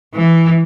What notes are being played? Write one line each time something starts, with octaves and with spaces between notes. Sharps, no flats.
E3